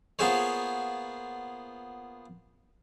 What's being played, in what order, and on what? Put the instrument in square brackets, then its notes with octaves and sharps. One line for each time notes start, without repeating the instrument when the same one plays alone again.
[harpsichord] A#3 B3 F4 G#4 C5 C#5